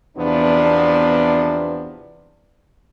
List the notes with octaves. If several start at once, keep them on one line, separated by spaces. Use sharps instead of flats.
E2 C3 F3 B3 D4